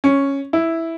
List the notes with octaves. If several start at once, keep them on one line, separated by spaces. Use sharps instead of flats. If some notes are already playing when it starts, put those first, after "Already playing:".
C#4
E4